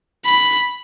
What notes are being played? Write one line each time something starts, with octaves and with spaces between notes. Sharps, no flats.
B5